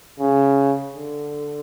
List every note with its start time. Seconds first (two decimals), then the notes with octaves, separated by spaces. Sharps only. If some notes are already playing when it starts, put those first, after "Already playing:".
0.20 C#3
0.95 D3